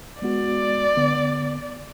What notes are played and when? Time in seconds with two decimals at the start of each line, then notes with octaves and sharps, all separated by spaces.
0.22 G#3 B3 F#4 D5
0.97 D3 B3